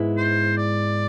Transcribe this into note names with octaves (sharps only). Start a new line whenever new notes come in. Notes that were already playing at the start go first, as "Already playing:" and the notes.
Already playing: G#2 G#3 B3 E4
C5
D5